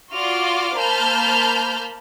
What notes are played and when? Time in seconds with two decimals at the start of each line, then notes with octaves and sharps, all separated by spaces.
0.12 F4 F#4 D5 C6 D6 F6
0.77 A#3 C5 A5 B5 F6 G6